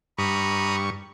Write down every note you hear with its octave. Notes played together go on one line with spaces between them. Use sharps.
G2 A#5 B5 C#6 D#6